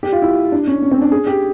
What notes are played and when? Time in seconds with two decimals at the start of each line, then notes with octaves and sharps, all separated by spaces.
0.03 G4
0.12 F4
0.22 E4
0.52 D4
0.67 C#4
0.82 C#4
0.91 C4
1.01 D4
1.12 G#4
1.27 G4